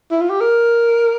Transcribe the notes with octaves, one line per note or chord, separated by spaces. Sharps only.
E4
F4
G4
A#4